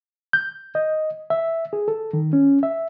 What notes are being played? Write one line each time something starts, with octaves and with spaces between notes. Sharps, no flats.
G6
D#5
E5
G#4
A4
D#3
C#4
E5